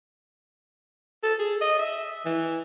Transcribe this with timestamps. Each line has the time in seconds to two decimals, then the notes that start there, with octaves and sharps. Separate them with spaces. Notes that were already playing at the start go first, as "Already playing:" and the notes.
1.23 A4
1.39 G#4
1.61 D#5
1.79 E5
2.26 E3